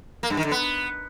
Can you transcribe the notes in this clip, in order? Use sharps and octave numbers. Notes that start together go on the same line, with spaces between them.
A#3
G2
D#3
D3
B3